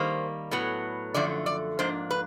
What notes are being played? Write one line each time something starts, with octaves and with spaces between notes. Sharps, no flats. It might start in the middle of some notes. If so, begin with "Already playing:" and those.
Already playing: D#3 G3 A#3 C5
A2 F#3 B3
F#2 D3 F3 A3 D5
D5
G#2 F3 A#3 D4 C5
B4